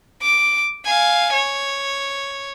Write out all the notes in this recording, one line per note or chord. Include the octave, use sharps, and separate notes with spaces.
D6
F5 G#5
C#5